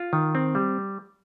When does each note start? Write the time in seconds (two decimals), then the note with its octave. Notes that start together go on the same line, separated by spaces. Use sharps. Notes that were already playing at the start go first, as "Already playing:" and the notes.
Already playing: F4
0.13 D#3
0.35 C4
0.55 G3